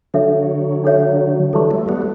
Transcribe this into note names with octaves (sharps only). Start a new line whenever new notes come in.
D3 F#3 D4 A4 C#5 E5
D4 A4 C#5 E5
E3 G3 A4 E5 A5 C#6
F#3 A3
G3 B3